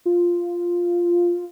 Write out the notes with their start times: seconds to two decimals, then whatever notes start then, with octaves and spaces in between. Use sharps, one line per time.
0.06 F4